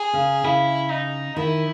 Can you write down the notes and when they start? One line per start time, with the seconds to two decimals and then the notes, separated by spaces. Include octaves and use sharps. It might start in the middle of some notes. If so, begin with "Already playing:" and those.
Already playing: G#4
0.13 C#3
0.44 C#3 E4
0.91 D#4
1.36 D#3 E4